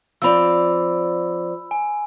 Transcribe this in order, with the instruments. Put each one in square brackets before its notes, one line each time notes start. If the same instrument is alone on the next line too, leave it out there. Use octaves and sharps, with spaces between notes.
[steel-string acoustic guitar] F3 C4 D5 [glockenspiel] B5 E6
[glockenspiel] G#5